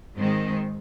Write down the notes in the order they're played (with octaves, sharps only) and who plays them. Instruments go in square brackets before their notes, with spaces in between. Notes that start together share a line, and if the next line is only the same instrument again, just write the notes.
[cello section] G#2 D#3 G#3 C4